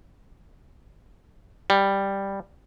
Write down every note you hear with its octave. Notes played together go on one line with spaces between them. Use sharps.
G3